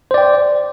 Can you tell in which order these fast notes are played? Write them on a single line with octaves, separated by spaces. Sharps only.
C5 D5 G5